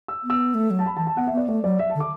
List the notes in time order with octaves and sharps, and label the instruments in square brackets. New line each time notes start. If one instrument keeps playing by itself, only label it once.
[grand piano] E6
[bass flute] B3
[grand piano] E6
[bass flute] A3
F#3
[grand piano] A5
B5
[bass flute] E3 [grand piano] A5
[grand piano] A5
[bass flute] B3 [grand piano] F#5
[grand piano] E5
[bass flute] B3 [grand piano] D5
[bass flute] A3 [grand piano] D5
[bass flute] F#3 [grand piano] D5
[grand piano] E5
A5
[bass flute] D3
[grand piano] D6